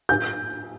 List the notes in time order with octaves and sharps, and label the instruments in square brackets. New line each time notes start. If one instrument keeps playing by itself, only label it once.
[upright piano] G6